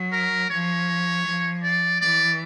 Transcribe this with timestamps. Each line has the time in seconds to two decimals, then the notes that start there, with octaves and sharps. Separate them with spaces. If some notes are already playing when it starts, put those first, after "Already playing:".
Already playing: F#3
0.12 A#4
0.50 F3 C#5
1.25 F3
1.63 D5
2.01 E3 D5